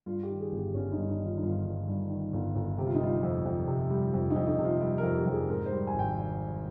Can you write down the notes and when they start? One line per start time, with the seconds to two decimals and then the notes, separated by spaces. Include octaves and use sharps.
0.06 G2 F4
0.23 G4
0.29 D#3
0.40 G#4
0.52 G1
0.57 G4
0.74 G1 C#4
0.92 D#4
0.97 G2
1.09 D#4
1.20 D#3
1.25 F4
1.38 D#4
1.43 G1 F4
1.65 G1
1.88 G2
2.10 D#3
2.33 G1
2.55 G1
2.78 C3 G4
2.86 F4
2.95 D#4
3.01 G3 F4
3.23 F2
3.46 F2
3.68 C3
3.90 G3
4.14 F2
4.30 D#4
4.36 F2
4.47 D#4
4.59 C3
4.64 F4
4.81 G3 G4
4.98 A#4
5.03 F2
5.15 G4
5.26 F2
5.32 G#4
5.48 G#2 A#4
5.66 C5
5.72 G3
5.87 G#5
5.94 G#1
5.99 G5